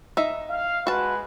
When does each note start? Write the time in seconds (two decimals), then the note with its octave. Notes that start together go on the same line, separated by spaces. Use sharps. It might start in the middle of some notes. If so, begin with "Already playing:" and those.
0.17 D#4 E5
0.50 F5
0.87 G#3 F#4 B4 A5